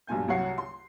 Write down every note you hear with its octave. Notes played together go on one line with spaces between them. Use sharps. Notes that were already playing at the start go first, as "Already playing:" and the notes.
B1 G2 A#2 G#5 G6
C2 F#3 C#5 F#5 C7
C6